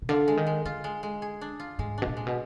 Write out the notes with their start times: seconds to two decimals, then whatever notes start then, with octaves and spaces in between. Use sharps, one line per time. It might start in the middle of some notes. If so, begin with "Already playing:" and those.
0.02 B2
0.09 D3 F4
0.28 G#3
0.37 D#3
0.47 G#3
0.65 D3 F4
0.84 G#3
1.03 G#3
1.22 G#4
1.41 D4
1.60 F4
1.79 G#2 G#3
1.98 B2 D4
2.07 A#2
2.17 G#3
2.27 B2